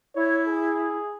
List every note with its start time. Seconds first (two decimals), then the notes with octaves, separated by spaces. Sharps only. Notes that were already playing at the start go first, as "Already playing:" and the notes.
0.15 E4 C#5
0.48 G#4